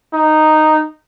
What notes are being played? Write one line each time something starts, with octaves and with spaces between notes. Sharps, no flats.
D#4